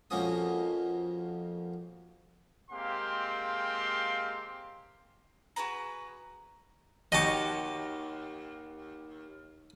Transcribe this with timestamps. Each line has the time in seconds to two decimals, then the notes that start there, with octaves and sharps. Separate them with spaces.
0.10 F2 F3 A#3 C#4 F#4 D#6
2.71 G#3 A#3 C4 G4 F5 C6
5.56 F#4 G#4 B4 A#5
7.12 D#2 F#4 G4 D#5 A5 C#6